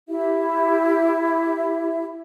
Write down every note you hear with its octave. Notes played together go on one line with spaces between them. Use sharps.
E4 G4 E5